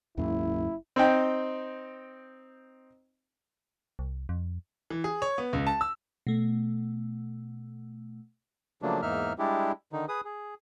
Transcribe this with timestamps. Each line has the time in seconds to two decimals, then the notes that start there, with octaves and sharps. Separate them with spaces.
0.17 F#1 D#2 G#2 F#3 E4
0.96 C4 D#4 G5
3.99 C2
4.29 F2
4.90 E3
5.04 G#4
5.22 C#5
5.38 B3
5.53 C#2
5.67 A5
5.81 E6
6.27 B2 A3
8.82 C#3 F3 F#3 A3 A#3 D4
9.02 E2 G#2 A#3 D#4 E5 F6
9.39 G3 G#3 D4 E4 G4
9.93 D3 D#3 D#4
10.08 G#4 B4 D#6
10.25 G#4